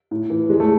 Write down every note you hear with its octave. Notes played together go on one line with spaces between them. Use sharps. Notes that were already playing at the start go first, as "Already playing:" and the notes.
A2
E3
E2 G#3
A3